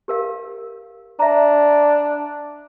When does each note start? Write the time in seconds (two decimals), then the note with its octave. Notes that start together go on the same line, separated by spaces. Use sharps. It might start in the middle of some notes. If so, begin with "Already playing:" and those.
0.08 G4 A#4 F5
1.19 D4 E5 A#5